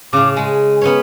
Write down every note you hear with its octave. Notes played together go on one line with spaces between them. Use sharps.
A2 C#3 D6
G#3 G#5
B3 C#4 C#5